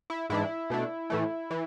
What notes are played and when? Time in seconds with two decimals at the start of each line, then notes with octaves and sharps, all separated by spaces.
0.10 E4
0.30 G#2 E3 G#3 D4 E4
0.70 B2 A3 D4
1.10 A2 E3 A3
1.51 E3